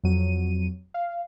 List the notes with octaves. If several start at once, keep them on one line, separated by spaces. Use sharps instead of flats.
F2 F#3 D#7
F5